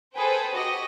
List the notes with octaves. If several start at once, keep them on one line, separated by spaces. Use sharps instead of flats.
G#4 A4 B4 C5 G5
F#4 G4 D#5